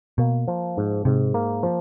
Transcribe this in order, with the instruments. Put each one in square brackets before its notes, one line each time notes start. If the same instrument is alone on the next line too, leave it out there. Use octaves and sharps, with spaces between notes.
[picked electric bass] B2 [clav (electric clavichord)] A#3
[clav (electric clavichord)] F3
G#2
[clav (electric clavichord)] G#2 [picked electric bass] C3
[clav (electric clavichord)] A#3
F3